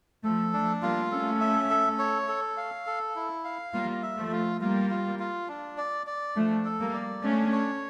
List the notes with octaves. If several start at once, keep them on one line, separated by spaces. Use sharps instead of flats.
F3 A3 A4
F3 A3 D4
G3 A#3 F4
A3 C#4 A4
E5
A4
C#5
A4
F5
A4
E4
F5
G3 A#3 F4
E5
F3 A3
F4
G3 A#3 F4
F4
F4
D4
D5
D5
F3 A3 D4
A4
G3 A#3
D5
A3 C#4 D4
C#5